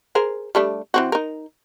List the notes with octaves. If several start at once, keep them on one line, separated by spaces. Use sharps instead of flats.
G#4 A#4 C5
G3 A3 D4
E3 C4 F#4
D#4 A#4